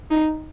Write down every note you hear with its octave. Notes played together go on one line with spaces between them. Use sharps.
D#4